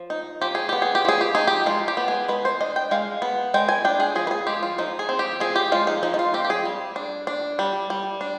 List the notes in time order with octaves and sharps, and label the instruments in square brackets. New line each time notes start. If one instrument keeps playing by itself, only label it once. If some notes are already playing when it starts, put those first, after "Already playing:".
Already playing: [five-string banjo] F3
D#4
F3 G4
G#4
B3 G4
G#4
G4
F3 G#4
G4
D#4 G#4
G4
G#3 F4
G4
B3
G#4
G#3 B4
C5
D4 D#5
G5
G#3 F5
B3
G#3 G5
G#5
D4 G5
G#4
F3 G#4
B4
G#4
G#3 G4
F4
F3 D#4
G#4
C4
G4
F3 G#4
G4
G#3 F4
D#4
F3 D#4
D#4
F4
C4 G4
G4
G#4
G3
D4
D4
G3
G3
D4